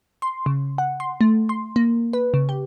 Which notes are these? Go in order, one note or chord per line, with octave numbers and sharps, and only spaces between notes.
C6
C#3
F#5
C6
A3
C6
A#3
B4
C#3
G4